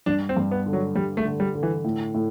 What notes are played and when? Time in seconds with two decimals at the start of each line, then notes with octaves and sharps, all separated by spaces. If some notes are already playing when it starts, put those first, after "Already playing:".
0.06 G2 D4
0.29 C4
0.37 G2
0.51 B3
0.66 D3
0.73 F#3
0.95 G2 G3
1.17 A3
1.25 D3
1.40 G3
1.55 D3
1.63 E3
1.84 A2
2.14 A2